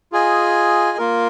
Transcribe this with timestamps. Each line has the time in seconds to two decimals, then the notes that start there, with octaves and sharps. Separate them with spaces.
0.12 F4 G#4 D#5 G#5
0.98 A#3 F4 A#4